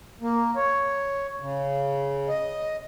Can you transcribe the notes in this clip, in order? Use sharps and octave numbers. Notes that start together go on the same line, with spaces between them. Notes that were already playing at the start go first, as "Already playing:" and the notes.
A#3
C#5
C#3
D#5